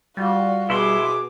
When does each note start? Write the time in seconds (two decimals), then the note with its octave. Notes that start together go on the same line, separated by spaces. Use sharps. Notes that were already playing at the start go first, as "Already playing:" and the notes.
0.17 G3 F4 F#4
0.70 B2 E4 G#4 C6 D6